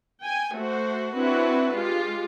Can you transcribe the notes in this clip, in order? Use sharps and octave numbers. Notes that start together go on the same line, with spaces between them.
G5 G#5
A3 F#4 C5
C4 D4 E4 F#4 B4
G#3 F4 G4